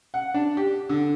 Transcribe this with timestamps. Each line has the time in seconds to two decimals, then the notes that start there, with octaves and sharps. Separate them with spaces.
0.14 F#5
0.34 D4
0.57 G4
0.89 D3